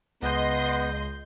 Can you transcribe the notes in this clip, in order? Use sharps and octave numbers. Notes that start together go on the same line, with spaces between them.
C#2 B3 D#5 C6 G6